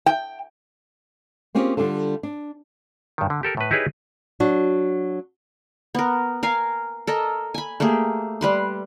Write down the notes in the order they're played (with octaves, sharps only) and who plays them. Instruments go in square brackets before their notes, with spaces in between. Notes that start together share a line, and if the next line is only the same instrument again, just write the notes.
[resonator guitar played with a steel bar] G5
[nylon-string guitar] A#3 C4 C#4 F4 G4 G#4
D3 G3 D4 F4 A4
D4
[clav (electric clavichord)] G2 D#3
D3
G4 A4 A#4
A2 B4
D#4 E4 G4 G#4 B4 C#5
[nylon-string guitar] F#3 D4 F#4
[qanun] B3 A#4
A#4 F5 G#5
A4 A#4 D#5
G#5 B5
A3 A#3 G4 G#4
G3 B4 C6